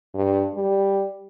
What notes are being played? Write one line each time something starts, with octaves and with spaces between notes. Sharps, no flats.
G2
G3